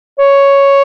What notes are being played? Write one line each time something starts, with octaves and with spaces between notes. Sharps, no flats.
C#5